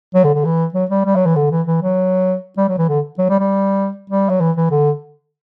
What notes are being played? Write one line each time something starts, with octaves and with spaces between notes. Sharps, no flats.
F#3
D3
D3
E3
F#3
G3
G3
F#3
E3
D3
E3
E3
F#3
G3
F#3
E3
D3
F#3
G3
G3
G3
F#3
E3
E3
D3